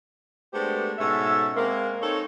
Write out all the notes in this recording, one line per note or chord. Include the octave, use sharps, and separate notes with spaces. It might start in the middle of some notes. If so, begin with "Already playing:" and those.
G#3 A3 B3 D4 G4 C5
G#2 B2 C#4 A4 E5
G#3 A#3 C4
C4 D#4 A4 C#5